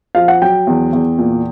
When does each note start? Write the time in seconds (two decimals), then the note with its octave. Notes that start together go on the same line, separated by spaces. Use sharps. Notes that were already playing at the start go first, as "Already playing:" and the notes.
0.15 F3 F5
0.28 F#5
0.42 F#3 G5
0.67 E2
0.93 E2
1.18 A#2